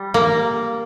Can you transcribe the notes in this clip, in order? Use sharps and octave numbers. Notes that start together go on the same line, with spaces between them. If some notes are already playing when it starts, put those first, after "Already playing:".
Already playing: G3
A#3